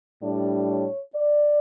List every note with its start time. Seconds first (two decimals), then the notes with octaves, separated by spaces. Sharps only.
0.22 A2 G3 D4 D5
0.68 C#5
1.15 D5